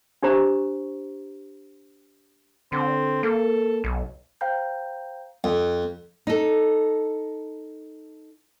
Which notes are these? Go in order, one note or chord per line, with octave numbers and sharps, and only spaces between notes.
D4 G4 C5 A#5 C#6
D3 C4
A#3 A4
B1
C5 F5 G5 A#5 G6
F2
D#4 A4